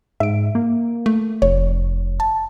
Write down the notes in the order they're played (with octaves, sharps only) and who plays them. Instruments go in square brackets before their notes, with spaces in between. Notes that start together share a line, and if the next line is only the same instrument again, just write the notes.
[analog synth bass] G#2 [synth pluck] E5 D7
[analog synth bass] A#3
[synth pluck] A3
[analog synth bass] F1 [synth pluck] C#5
[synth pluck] A5